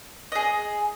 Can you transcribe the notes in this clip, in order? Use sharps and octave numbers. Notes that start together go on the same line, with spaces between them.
G#4 D#5